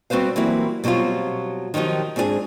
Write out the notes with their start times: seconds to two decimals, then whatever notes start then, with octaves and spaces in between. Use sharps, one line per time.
0.10 G3 C4 F#4 B4 C5 F5
0.36 E3 F#3 G3 A#3 C4 E4
0.84 B2 F#3 G3 C4 F4
1.74 D#3 F3 F#3 D#4 G4
2.16 G#2 C4 D4 F#4 G#4